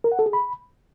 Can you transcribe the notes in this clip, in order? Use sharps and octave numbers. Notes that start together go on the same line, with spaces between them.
A#4
F#5
A4
G#4
B5